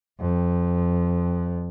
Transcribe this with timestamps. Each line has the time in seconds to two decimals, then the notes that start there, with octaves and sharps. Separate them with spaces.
0.20 F2